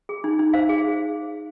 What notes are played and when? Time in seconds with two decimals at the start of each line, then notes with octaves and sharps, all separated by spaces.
0.09 G#4
0.24 D#4
0.39 D#4
0.53 C5 F5
0.69 G#4